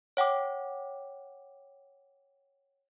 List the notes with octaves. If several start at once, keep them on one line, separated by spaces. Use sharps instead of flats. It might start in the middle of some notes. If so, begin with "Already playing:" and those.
C#5 F#5 G5 D6